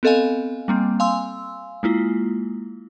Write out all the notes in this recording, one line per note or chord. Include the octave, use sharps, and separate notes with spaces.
B3 C4 A4 D#5 F5 G#5
G3 A#3 C4
F5 G#5 C6 E6
G#3 A#3 E4 F4